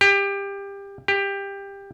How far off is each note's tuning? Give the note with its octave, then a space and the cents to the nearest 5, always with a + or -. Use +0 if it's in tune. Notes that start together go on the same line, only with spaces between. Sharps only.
G4 +20
G4 +15